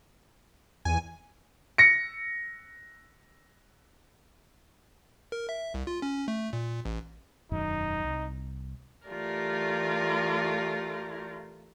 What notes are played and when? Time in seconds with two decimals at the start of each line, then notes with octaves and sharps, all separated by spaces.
0.85 E2 G#5
1.78 A#6 C#7
5.32 A#4
5.49 E5
5.74 C2
5.87 F4
6.02 C#4
6.28 A3
6.53 A#2
6.85 A1
7.52 E1 F#2 D#3 D#4
8.04 C2
9.08 E3 A3 F4 G4 A#4 D5